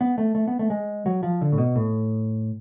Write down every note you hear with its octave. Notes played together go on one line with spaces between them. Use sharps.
B3
A3
A3
B3
A3
G#3
F#3
F3
D3
A2
B2
A2